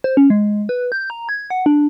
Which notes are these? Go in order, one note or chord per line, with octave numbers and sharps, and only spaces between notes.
C5
C#4
G#3
B4
G6
A#5
G#6
F#5
D4